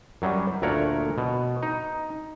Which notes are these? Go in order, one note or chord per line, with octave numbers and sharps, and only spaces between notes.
F#2 F#3 G3
D2 A#2 A3 A#4 C#5 F#5
B2
D#4